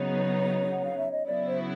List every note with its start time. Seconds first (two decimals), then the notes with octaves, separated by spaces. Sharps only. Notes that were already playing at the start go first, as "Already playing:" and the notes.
Already playing: C#3 F#3 B3 D#4 C#5
0.72 F#5
0.85 F5
0.99 E5
1.12 D#5
1.26 C#3 F#3 B3 E4 D5
1.46 C5